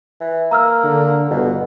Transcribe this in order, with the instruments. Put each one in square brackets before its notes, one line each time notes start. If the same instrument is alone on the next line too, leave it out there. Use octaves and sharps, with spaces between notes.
[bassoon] E3
[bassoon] A#3 [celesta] A#5 E6 F6
[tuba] D3
[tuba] G1 [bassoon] B2